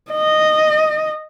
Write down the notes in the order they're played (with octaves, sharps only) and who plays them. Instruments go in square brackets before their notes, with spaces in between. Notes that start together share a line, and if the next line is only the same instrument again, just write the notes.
[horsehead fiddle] D#5